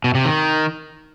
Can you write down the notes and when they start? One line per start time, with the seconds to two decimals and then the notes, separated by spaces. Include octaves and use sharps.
0.04 B2
0.15 C3
0.25 D#3